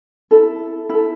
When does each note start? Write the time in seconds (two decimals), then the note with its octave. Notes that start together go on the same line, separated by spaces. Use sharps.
0.31 E4 A4
0.89 E4 A4